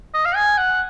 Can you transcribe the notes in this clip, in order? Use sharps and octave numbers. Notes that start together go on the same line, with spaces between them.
D#5
F5
G#5
F#5